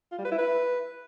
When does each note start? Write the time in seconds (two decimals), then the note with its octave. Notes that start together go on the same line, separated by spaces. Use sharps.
0.12 F4
0.18 G3
0.25 B4
0.32 E4
0.38 B4